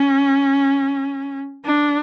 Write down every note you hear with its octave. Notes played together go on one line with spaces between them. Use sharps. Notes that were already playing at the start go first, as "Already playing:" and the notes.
Already playing: C#4
D4